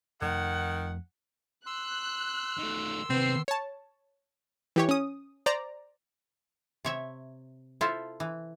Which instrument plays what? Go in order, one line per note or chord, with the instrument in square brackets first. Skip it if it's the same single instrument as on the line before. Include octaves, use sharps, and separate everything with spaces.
[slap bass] F2 A3 [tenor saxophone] D#3 [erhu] F#5
[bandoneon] C6 E6 [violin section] F#6
[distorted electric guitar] D#3 A3
[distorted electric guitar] C3 D#3 [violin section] B3 C7 [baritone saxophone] C4
[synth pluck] C#5 A5
E3 G4 C#5
C#4 D#6
C5 D5 A#5
[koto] C3 C#5 E5
E4 F4 A4 C5
E3